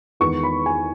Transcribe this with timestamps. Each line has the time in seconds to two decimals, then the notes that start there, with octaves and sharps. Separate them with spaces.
0.20 E2 D#3 G#3 B3 C#6
0.43 B5
0.66 G#5